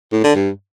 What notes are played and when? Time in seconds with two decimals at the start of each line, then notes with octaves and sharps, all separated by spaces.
0.12 A2
0.24 D3
0.35 G2